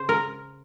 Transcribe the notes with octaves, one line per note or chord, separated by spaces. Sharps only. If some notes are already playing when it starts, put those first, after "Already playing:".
Already playing: C#3 C5
A#4